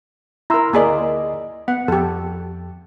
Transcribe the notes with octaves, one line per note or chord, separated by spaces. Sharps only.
E4 A#4 A#5 C6 E6
D2 A#3 G#4 D5 D#5
B3 F#5
F2 G4 A4